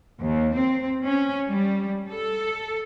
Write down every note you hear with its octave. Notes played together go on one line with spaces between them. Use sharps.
D#2
C4
C#4
G3
A4